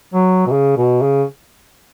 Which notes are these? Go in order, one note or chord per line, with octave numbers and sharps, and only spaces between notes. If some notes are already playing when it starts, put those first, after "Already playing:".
F#3
B2
C#3
B2
C#3